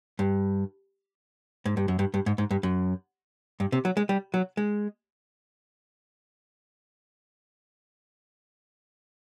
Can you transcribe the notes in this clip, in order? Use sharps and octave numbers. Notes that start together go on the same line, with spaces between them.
G2
G#2
G2
F#2
G2
G2
G#2
G#2
G2
F#2
G2
C3
F#3
G#3
G3
F#3
G#3